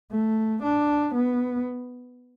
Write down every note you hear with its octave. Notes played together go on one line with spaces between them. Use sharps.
A3
D4
B3